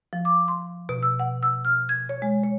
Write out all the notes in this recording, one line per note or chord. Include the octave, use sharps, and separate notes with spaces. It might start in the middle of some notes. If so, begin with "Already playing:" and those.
F3
D6
C6
B2
E6
F#5
E6
F6
G#6
C#5
G#3
C#5